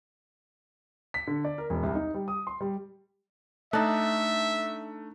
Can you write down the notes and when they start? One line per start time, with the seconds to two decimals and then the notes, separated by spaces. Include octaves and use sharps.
1.14 B6
1.27 D3
1.45 D5
1.58 A#4
1.70 E1
1.83 C2
1.95 D#4
2.14 G3
2.28 D#6
2.47 C6
2.61 G3
3.73 A3 D4 D#4 E5 F#6